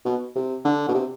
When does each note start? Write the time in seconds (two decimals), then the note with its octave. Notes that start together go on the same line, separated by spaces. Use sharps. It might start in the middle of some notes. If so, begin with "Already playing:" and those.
0.05 B2
0.35 C3
0.65 D3
0.89 B2
0.94 C3